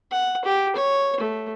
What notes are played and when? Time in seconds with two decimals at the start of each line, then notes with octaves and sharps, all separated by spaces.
0.12 F#5
0.45 G4
0.76 C#5
1.20 A3